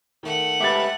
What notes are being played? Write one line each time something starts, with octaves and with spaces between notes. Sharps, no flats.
D#3 A3 F#5
C#2 G4 B4 E5 D6 A6